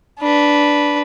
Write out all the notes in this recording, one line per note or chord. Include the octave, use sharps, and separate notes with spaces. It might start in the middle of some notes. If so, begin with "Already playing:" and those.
D4 B4